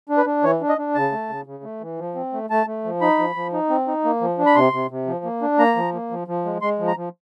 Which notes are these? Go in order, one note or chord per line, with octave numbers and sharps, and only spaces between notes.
D4
B4
D4
E3 C#5
D4
D#5
D4
C#3 A5
A3
C#3
C#3
A3
E3
F3
C4
A3
A3 A5
A3
F3
D#4 B5
F3
F3
D#4
C4
D#4
A#3
F3
D4
B5
C3 C6
C3
C3
F3
A#3
D4
A#3 A#5
F3
A#3
F3
F3
G#3
G#3 C6
F3
A#5
F3